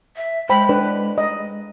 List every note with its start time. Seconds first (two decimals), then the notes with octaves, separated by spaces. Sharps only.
0.16 E5
0.49 G#3 C5 G5 B5
0.69 D4 B4
1.18 D#5